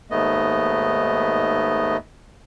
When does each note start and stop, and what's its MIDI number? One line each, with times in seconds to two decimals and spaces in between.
0.11 1.97 39
0.11 1.97 44
0.11 1.97 57
0.11 1.97 59
0.11 1.97 75